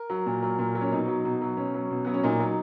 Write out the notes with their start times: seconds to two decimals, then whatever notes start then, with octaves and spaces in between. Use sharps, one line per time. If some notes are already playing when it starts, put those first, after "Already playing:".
Already playing: A#4
0.10 F#3
0.26 A#2
0.43 F#3
0.59 A#2
0.75 F#3
0.81 C#4
0.91 B2 D#4
1.08 F#3
1.25 B2
1.42 F#3
1.57 B2 C#4
1.74 F#3
1.91 B2
2.05 F#3 B3
2.14 C#4
2.23 A#2 D#4
2.40 F#3